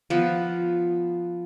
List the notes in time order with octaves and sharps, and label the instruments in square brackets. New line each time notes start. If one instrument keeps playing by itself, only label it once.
[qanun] F3 B3